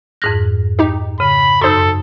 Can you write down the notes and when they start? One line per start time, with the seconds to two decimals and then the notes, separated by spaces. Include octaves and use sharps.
0.22 F2 G#2 F6 F#6 A#6
0.79 D#4 G4
1.20 C#3 B5
1.61 F#2 D#4 A4 C5 C6 E6